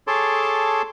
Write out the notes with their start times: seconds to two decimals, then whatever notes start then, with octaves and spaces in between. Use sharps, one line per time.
0.07 G#4 A4 C#5 A5 C6 D6